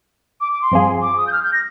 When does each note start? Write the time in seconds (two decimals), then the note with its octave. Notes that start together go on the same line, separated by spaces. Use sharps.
0.41 D6
0.52 D6
0.62 C6
0.71 G2 F3 C4 F4 G#4
1.02 D6
1.17 D#6
1.27 G6
1.32 F6
1.44 G6
1.53 A#6